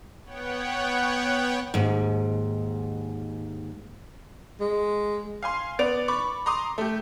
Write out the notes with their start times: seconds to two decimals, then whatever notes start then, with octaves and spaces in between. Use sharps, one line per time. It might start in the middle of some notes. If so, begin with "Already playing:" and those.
0.24 B3 C#5 F#5 G5
1.74 D#2 G#2
4.61 G#3
5.43 F5 G#5 C6
5.79 B3 D5 A6 D7 F7
6.08 B5 C#6 D6
6.46 A#5 C6 D6 D#6
6.78 A3 G4